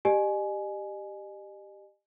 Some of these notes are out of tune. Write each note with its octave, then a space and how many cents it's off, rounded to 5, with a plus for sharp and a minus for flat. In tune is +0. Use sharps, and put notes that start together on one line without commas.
G4 +0 D#5 -40 G#5 +15